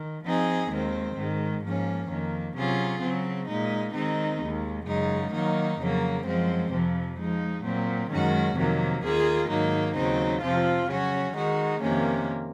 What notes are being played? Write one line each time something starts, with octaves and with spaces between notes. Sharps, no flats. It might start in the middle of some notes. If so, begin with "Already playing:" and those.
Already playing: D#3
F3 C4 D#4 G#4
D#2 D#3 G#3 C4
G#2 D#3 G#3
G#2 F3 A#3 C#4
F2 D#3 A#3
C3 F#3 C#4 F4 G#4
C#3 F#3 C4
A#2 G#3 D#4
D#3 G#3 C4 D#4
D#2 D#3 G#3
F#2 C#3 G#3 D#4
D#3 F#3 A#3 D#4
F2 C#3 F#3 A#3
F#2 F3 G#3 C4
F2 C3 F3
F3 G#3 D#4
A#2 F#3 C4
F#2 D#3 G#3 C#4 F#4
F2 C3 D#3 F#3 A#3
D#2 D#3 A#3 F4 G#4
G#2 D#3 F#3 A#3 D#4
D#2 C#3 F#3 C4 D#4
F2 C3 F3 C4 F4
C#3 F#3 C#4 F#4
D#3 G#3 D#4 F#4
F2 C3 D#3 A#3 C#4